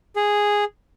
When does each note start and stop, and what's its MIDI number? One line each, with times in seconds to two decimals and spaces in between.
0.16 0.64 68